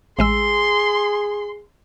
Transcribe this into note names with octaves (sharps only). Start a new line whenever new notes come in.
A1 G#3 G#4 C6 E6